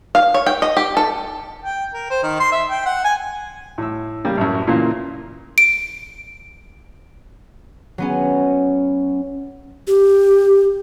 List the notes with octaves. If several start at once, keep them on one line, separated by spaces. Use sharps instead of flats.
F5
C#5
G5
D#5
G4
A4
G5
A#4
C5
D#3
C6
E5
G5
F#5
G#5
A2 E6
C#3 G3 A#3
A1 F#2
A#2 C#3 E3 A#3
D7
F#3 B3 C#4
G4